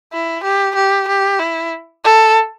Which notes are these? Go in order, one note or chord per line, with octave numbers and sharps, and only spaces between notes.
E4
G4
G4
G4
E4
A4